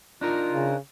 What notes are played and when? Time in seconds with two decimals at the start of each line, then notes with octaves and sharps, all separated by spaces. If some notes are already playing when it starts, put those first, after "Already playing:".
0.21 D4 D#4 F4 A#4
0.51 C#3